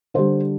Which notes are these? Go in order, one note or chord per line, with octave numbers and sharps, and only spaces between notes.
D3 G3 C5